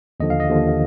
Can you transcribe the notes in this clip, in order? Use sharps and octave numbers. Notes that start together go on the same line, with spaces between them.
D#2 D3 F3 D#5
F5
D#5
D#2 D3 F3